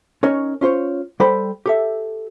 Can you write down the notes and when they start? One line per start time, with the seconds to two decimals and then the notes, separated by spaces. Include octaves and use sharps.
0.23 C#4 D#4 A#4 C#5
0.61 C#4 F4 C5 C#5
1.20 G3 A4 C5 G5 B5
1.66 G4 A4 E5